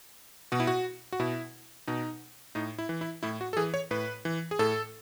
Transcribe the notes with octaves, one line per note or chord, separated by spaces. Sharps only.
B2 F#4
E4
F#4
F#4
B2 E4
B2 D#4
A2 D#4
E4
E3
E4
A2 E4
F#4
A4
E3 G#4
C#5
A2 B4
E3
G#4
A2 A4